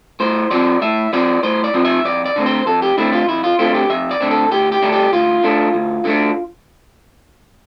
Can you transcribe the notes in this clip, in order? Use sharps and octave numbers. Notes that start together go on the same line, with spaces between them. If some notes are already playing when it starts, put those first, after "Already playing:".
A2 C5
F3 C4 D5
A2 E5
F3 C4 D5
A2 C5
D5
F3 C4
E5
F2 D5
D5
D3 A3 C4
C5
F2 A4
G4
D3 A3 C4 E4
F4
F2 E4
F4
D3 A3 C4 F4
G4
F2 E5
D5
D3 A3 C4
A4
D2 G4
G4
D3 A3 D4
G4
D2 F4
D3 A3 D4
D2
D3 A3 D4